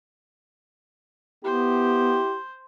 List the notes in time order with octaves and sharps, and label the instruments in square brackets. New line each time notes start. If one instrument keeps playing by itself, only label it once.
[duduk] B3 [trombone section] E4 G4 [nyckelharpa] C5